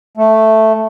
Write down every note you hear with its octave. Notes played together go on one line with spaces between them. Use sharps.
A3